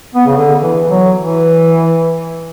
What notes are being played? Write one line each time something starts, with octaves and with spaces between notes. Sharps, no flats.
B3
C#3
D3
E3
F#3
E3